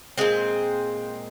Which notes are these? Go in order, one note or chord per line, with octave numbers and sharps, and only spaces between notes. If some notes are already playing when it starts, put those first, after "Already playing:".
A#2 G#3 C4